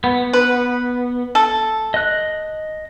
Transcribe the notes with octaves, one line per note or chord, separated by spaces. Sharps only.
B3
B4
A4
D#5 F#6